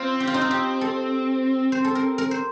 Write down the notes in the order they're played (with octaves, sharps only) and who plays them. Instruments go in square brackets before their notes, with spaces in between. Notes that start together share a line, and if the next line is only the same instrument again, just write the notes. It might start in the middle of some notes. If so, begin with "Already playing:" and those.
Already playing: [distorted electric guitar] C4 [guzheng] F4
[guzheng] G4
F4
D#4
F4
G4
A4
C5
A4
A#4
A#4
C5